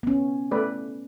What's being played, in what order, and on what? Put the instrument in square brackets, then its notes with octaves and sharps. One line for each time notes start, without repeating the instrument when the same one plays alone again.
[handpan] B3 C#4
[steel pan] A3 B4 D5